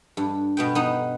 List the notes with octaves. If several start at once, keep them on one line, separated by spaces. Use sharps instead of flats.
G2
B2 B3 G5
B3 D#4